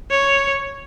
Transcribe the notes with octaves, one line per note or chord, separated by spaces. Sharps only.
C#5